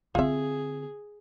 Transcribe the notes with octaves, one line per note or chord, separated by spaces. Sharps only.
D3 C4 F4 G#4 E5